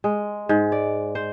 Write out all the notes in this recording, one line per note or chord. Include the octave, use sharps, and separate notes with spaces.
G#3
G#2
D5
C5